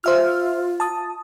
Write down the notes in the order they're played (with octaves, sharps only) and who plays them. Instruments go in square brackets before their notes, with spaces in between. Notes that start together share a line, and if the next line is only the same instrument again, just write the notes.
[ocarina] F4 [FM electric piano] C5 E5 F6
[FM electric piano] A5 D#6